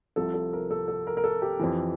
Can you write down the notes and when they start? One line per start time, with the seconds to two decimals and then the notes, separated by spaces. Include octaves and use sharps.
0.16 C2 C3 F3 A4
0.34 A4
0.53 A#4
0.71 A4
0.88 A4
1.07 A#4
1.17 A#4
1.24 A4
1.42 G4
1.59 F2 E3